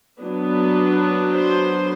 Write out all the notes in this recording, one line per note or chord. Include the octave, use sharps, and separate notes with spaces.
F#3 B3 D4
C5